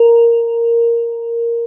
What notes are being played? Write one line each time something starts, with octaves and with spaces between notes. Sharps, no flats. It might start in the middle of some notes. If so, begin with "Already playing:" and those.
Already playing: A#4